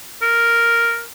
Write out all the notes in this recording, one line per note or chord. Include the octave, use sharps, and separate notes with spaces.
A#4